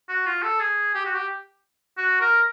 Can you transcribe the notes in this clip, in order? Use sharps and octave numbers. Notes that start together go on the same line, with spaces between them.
F#4
F4
A4
G#4
G4
F#4
G4
F#4
A#4